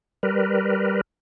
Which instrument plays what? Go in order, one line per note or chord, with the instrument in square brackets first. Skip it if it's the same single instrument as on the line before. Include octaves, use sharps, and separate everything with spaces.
[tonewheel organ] G3 A#4 B4